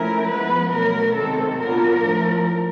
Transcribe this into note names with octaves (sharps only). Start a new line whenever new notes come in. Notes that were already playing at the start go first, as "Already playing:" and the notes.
Already playing: F3 A3 C#4 E4 A#4
F3 G#3 B3 B4
B2 F#3 A3 C#4 A#4
C3 D#3 G#3 A4
A#2 F#3 B3 D4 F4 A#4
A2 F3 A3